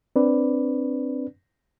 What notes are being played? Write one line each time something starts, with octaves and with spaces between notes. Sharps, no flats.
C4 D4 B4 D5